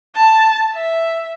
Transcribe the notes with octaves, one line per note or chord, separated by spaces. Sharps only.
A5
E5